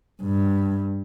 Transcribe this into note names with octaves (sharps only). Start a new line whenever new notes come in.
G2